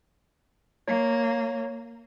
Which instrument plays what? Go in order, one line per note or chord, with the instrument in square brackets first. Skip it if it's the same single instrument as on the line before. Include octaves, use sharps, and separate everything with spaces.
[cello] A#3 [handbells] C#5